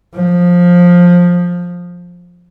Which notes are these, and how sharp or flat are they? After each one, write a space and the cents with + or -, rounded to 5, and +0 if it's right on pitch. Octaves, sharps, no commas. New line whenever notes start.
F3 +15